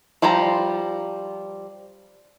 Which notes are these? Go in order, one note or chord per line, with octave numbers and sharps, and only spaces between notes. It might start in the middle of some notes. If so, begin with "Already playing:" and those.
F3 G3 C5 G5 A#5